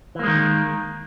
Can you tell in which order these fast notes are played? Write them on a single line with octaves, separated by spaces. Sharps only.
E3 A#3 G#3 D#3